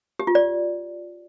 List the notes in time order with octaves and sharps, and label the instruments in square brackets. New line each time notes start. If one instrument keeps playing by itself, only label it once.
[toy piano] G4
F4
D5